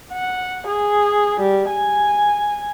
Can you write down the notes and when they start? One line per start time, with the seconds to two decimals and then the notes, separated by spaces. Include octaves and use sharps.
0.13 F#5
0.67 G#4
1.40 G3
1.69 G#5